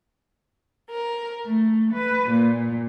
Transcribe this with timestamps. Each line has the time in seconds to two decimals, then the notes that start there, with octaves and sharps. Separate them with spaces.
0.89 A#4
1.45 A3
1.93 B4
2.29 A#2